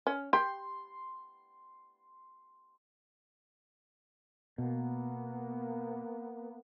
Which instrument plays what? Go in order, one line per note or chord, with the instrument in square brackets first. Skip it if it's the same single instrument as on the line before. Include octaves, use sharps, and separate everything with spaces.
[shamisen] C#4
[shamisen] G4 [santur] C6
[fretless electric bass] B2 [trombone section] A#3 B3